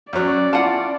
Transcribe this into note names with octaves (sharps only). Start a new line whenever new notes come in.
F#2 F#3 C#4 D5
E4 F4 F#5 A5